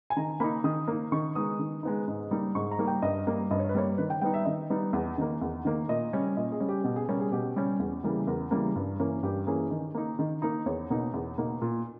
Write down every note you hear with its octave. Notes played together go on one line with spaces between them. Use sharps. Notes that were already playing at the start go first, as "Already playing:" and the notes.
G#5
D#3 A#5
A#3 D#4 B5
D#3 D#6
A#3 D#4
D#3 C#6
G#3 B3 D#4 D#6
D#3
G#3 B3 D#4
G#2
G3 A#3 D#4
G#2 C#6
A#5
G3 A#3 D#4
G5
G2 D#5
G3 A#3
G2 D#5
C#5
B4
G3 A#3 C#5
D#3 B4
G5
G3 B3 D#4 G5
E5
D#3 D#5
G3 B3 D#4
E2
D#3 A#3
E2
D#3 A#3
A#2 D#5
G3 C#4
A#2 D#5
G#4
G3 C#4
G4
B2 G4
G#4
G3 C#4 A#4
G#4
B2 G4
G3 C#4
E2
C#3 E3 G3 A#3
E2 A#4
C#3 E3 G3 A#3
G2
E3 A#3 C#4
G2 G4
E3 A#3 C#4 G#4
D#3
A#3 D#4
D#3
A#3 D#4
E2 C#5
B2 A#3 D#4
E2
B2 A#3 D#4
A#2